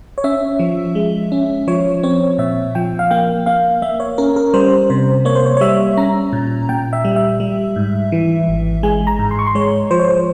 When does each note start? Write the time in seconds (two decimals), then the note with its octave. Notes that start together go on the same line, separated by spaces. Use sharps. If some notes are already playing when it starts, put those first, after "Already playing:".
0.18 C#5
0.24 C#4 E5
0.59 F3
0.95 G#3
1.32 C#4
1.68 F3 C#5
2.03 C4 C#5
2.38 A#2 E5
2.75 F3 G5
2.99 F5
3.11 A#3 G5
3.46 A#3 F5
3.82 A#3 E5
4.00 C#5
4.18 C#4 A#4
4.36 A#4
4.54 G3 C5
4.90 C3 C5
5.25 A#3 C#5
5.35 C5
5.46 C#5
5.57 C#5
5.61 G3 E5
5.97 C#4 A#5
6.33 A#2
6.69 A#2 G5
6.93 E5
7.05 G3
7.16 E5
7.40 G3
7.76 G#2
8.12 E3
8.48 G#1
8.83 G#3 G#5
9.07 A#5
9.19 G#2
9.31 C6
9.39 C#6
9.46 C6
9.55 G#3 C#5
9.91 F3 C5
9.99 C#5
10.08 C5